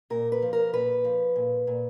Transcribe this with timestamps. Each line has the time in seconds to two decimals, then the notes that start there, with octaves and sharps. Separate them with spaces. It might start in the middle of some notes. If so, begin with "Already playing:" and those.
0.10 A#2 A#4
0.32 B4
0.42 F3
0.53 A#4
0.73 A#2 B4
1.04 F3
1.36 A#2
1.67 A#2